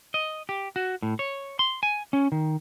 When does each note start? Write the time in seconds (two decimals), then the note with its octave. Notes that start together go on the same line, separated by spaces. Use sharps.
0.14 D#5
0.49 G4
0.76 F#4
1.02 A2
1.19 C#5
1.59 C6
1.83 G#5
2.13 C#4
2.32 D#3